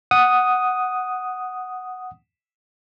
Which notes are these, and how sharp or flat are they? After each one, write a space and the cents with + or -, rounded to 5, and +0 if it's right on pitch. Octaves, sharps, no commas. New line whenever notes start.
F#5 +0 D#6 +0